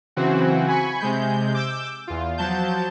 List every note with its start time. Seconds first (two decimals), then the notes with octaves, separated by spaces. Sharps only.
0.16 C#3 E3 F#3 C4 F#4
0.68 G#5 B5 C#6
1.01 C3 G#3 G6
1.54 D6 E6 G6
2.07 E2 F4
2.37 F3 F#3 A5 G6